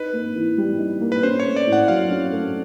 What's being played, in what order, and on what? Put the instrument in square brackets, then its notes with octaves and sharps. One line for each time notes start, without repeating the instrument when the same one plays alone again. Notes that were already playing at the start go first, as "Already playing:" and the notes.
Already playing: [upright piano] D#4 [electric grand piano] B4
[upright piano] A#3
E3
G3
D#4
A#3
[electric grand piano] B4
[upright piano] C#4 [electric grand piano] C5
[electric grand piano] C#5
[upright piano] A3
[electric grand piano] D5
[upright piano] A2
[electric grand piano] F#5
[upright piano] F#3 [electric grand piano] F5
[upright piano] C#4
A3